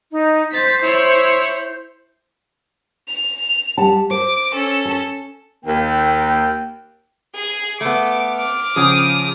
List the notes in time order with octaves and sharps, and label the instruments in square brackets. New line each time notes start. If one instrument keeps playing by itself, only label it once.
[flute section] D#4
[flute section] C5 [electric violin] A6 B6
[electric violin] E4 C#5
[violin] F7
[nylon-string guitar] G3 F#5 A5
[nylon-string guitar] C5 [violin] D6
[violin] C#4 A4
[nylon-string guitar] A5
[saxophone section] D#2 [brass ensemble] A#3 G5
[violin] G#4
[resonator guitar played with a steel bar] A3 B3 [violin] D6
[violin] D6 F6
[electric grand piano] C#3 F3 [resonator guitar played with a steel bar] G#4 G5 [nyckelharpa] D#6